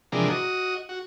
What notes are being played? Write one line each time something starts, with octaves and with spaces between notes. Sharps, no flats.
C3 E3 F3 G#3 D4 A#4
F#4 D#5
F#4